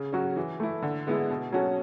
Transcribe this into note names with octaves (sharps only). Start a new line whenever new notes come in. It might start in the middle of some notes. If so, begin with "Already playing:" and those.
Already playing: C#3
F#3 C#4 F#4
E3
A3 E4
D3
G#3 B3 E4
B2
F#3 C#4 F#4 A4